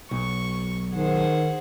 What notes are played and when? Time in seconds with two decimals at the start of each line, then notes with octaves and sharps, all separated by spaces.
0.11 B1 C#6
0.95 D#3 G#4 C5 F#5